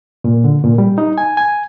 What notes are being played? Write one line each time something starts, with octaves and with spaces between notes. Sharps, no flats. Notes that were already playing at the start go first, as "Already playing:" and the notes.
A#2
D3
A#2
G3
D#4
G#5
G#5